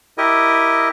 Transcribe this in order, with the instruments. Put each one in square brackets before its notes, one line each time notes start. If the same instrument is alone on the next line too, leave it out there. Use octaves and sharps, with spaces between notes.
[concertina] E4 G4 A#4 D#5